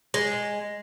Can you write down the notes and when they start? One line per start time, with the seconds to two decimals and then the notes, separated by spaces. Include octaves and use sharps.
0.14 G#3